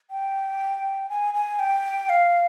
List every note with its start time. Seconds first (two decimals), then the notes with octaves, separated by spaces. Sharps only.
0.11 G5
1.10 G#5
1.34 G#5
1.59 G5
2.09 F5